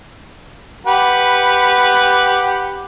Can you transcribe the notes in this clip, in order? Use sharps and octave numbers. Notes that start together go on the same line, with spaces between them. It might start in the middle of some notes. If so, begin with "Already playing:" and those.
G4 B4 F#5